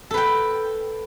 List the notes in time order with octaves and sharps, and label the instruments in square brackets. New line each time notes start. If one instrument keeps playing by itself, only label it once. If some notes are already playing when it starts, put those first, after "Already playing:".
[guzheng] A4
B4
G5